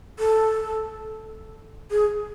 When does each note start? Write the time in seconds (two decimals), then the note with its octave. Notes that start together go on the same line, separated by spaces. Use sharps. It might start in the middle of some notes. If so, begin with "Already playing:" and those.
0.19 A4
1.91 G#4